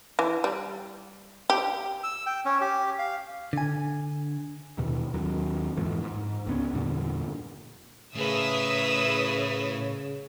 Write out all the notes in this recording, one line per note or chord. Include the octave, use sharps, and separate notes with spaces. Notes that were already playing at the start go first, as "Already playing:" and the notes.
E3
G3
G4
E6
G5
C#4
G4
F5
D3 G#5
D#2 B2
D#2 F#3
F2 G#2 E3 F3
G#2
C#2 B3 C#4
E2 G2 A#2 D3
A2 C#3 A#4 B4 E5 D#6 E6